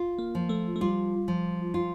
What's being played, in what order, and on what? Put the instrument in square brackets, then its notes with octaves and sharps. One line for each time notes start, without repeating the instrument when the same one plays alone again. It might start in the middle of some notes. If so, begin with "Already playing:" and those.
Already playing: [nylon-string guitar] F4
[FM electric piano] A#3
[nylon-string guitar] F3
[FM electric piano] A3
A3
[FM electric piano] G3 [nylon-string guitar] F4
[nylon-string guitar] F3
F4